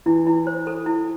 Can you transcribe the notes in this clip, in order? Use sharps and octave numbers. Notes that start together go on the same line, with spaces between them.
E3 E4
E4
C5
A4
E4